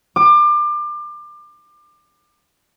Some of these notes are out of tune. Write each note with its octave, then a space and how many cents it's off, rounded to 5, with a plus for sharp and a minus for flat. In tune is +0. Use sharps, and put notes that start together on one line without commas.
D6 +30